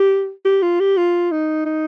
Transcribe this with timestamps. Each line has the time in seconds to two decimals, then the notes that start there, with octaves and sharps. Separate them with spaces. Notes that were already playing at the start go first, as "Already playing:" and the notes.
Already playing: G4
0.45 G4
0.62 F4
0.80 G4
0.97 F4
1.31 D#4
1.65 D#4